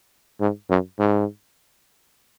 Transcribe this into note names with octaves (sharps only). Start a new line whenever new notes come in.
G#2
F#2
G#2